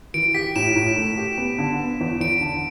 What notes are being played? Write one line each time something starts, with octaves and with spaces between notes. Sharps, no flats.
E3 D7
G4 B6
A2 E7
A2
A3
G4
B3
D3
B3
E2
E2 D7
D3